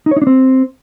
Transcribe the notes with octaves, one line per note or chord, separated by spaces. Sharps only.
D#4
C#5
D#4
D4
C4